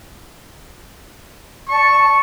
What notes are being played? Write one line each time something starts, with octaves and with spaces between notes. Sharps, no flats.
D5 A5 C#6